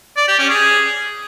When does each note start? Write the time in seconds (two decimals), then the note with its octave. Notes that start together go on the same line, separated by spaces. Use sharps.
0.17 D5
0.28 G4
0.39 C#4
0.50 G#4